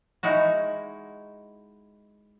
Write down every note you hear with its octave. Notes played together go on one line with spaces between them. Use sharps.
G#3 D#4 E4 F#4